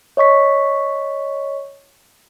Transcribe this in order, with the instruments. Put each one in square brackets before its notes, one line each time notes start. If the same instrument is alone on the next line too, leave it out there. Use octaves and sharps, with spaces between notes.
[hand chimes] C#5 D#5 C#6 B6